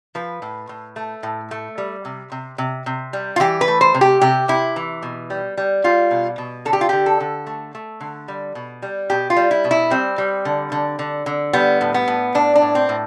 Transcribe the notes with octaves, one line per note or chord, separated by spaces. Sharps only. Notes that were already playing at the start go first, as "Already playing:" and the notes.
F3 B4
A2
A2
A3
A2
A3
G3
C3
C3
C3
C3
G3
F4
E3 G4
B4
A3
C5
C3
G4
C3 G4
C3 E4
E3
B2
G3
G3
G3 F4
B2
B2
D3 A4
G4
F4
D3 G4
A4
D3
A3
A3
D3
G3
B2
G3
B2 G4
F4
G3
E4
B2
E4
G3 C4
G3
D3
D3
D3
D3
G3 B3
A2
B3
A2
A2 D4
D4
A2
C4
A2